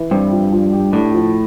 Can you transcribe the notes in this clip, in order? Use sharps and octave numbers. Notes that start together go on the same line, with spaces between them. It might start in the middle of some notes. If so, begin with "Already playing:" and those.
Already playing: E3
G2 C4
F3
F3
G4
A2 D4
F3